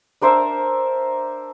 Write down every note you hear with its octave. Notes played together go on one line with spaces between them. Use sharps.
D4 A#4 C5 E5